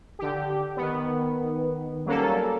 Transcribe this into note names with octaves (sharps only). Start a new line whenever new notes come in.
D3 G4
D#3 B3
F#3 G3 A#3 C#4 A4